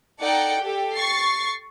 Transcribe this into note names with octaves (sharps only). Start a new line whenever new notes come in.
D#4 A4 D5 F#5 G5 C#7
G4 A4
C#6 A6 C7